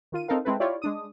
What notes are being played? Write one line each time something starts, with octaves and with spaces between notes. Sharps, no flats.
D#3 F4 D#7
C4 D#4 A4 A#4 F5
G#3 C4 E4 A4 B4
E4 F4 G4 C#5 D5
G#3 D4 D#6